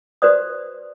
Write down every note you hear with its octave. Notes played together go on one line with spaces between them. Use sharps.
F#4 B4 C5 D5 D#6